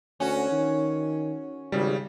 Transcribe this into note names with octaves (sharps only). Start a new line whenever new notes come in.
D2 C#4 F#4
D#3
G#1 C#3 G3